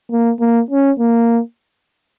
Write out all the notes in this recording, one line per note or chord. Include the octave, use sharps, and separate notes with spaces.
A#3
A#3
C#4
A#3